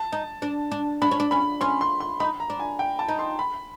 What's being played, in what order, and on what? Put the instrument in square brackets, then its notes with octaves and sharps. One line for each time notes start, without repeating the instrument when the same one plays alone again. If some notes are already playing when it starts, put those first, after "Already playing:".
Already playing: [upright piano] A5
[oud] D#4
D4
D4
[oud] D4 [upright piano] B5
[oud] C#4
D4
[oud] C#4 [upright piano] B5
[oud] C#4 [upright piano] C6
[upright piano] C6
C6
[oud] D#4 [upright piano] B5
[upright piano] A#5
[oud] D4
[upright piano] G#5
G5
A5
[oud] D#4
[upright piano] C6
B5